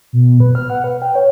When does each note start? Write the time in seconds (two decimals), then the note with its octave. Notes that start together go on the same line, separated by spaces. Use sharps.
0.13 B2
0.40 B4
0.55 F6
0.70 F#5
0.84 B4
1.02 G5
1.15 C#5